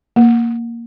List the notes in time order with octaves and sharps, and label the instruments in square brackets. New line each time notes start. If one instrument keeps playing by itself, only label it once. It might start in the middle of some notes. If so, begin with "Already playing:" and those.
[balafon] A#3